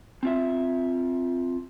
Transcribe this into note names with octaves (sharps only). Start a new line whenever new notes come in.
C4 F4 E5